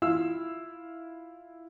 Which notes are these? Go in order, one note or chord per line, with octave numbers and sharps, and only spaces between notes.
E4 F4 F5 E6